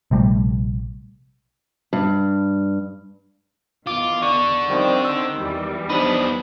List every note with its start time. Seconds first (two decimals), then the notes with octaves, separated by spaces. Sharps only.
0.11 A#1 C3 G3 A3
1.93 G2
3.87 E2 D#3 F4 D6
4.22 D3 D4 C#6
4.68 D#3 F3 G3 C4
5.05 D#3 E6
5.37 E2 E3 G3
5.90 F3 B3 D4 D#4 B5 D#6